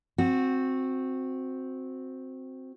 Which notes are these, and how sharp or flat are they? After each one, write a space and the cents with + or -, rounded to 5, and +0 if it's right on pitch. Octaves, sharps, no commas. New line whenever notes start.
C4 +0 F#4 -15